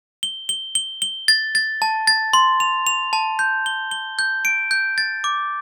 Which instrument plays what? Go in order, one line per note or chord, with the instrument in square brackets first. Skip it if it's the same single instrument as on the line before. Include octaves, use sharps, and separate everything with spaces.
[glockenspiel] G7
G7
G7
G7
A6
A6
A5
A6
C6
F7
F7
A5
G6
G7
G7
G6
D7
G6
A6
D6